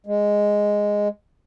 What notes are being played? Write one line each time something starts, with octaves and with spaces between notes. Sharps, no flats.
G#3